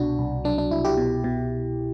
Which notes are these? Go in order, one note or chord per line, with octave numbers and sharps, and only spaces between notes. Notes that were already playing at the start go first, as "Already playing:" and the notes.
Already playing: C2 B2 D4 F#4
C2
F#3 D4
D4
C2 E4
E4 G4
B2
B2